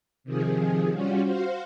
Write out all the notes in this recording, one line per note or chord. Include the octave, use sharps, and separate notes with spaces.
C3 D#3 F3 G#4
G3 C#4 F4 F#4
F#4 C5 F5